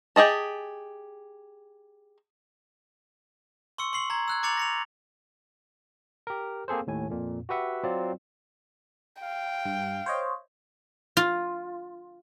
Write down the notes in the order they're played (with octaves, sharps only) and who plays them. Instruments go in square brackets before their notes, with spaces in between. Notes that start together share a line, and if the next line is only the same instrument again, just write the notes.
[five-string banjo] G4 G#4 D#5 A5
[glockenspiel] C6 C#6 E6 C#7
C6 C#6 C7 F#7
A#5 G#6
E6 F#6 G#6
A#5 D6 A6 C#7 F7 F#7
A#6 C#7 F7
[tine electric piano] G4 A#4
A#3 C4 G#4 A4 C5
D#2 A2 G#5
F2 A#2
F#4 G4 B4 E5 F#5
F#3 C4 F4 D5
[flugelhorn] F5 [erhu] G5
[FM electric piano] G2
C5 C#5 D#5
[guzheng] F4